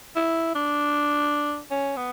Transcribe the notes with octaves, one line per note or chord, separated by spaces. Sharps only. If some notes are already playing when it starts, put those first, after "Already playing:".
E4
D4
C#4
B3